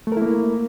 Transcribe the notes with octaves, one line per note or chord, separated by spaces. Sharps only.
A3 A#3 E4 A#4